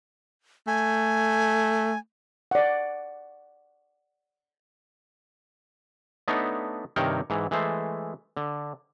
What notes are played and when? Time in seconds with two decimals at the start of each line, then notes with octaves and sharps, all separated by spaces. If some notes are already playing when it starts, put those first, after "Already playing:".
0.67 A3 G#5
2.51 D5 F#5
6.28 A3 B3 D4 D#4 C#5
6.96 G2 C3 D#3 A#4 C#5 G5
7.30 G#2 E3
7.51 E3 G#3 A3 C5
8.37 D3